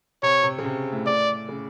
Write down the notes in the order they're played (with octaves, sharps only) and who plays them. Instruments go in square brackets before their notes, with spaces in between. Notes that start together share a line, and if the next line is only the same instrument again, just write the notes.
[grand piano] C3 [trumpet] C#5
[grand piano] C3
C#3
C3
A2
[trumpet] D5
[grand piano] C#3